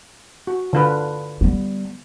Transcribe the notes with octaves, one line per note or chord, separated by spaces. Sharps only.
F#4
D3 F4 B4
G3 B3